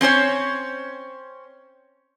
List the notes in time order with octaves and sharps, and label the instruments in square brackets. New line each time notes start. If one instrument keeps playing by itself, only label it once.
[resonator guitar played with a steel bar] C4 C#4 C5 C#5